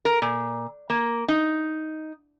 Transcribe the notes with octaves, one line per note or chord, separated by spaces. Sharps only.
A#4
A#2
A#3
D#4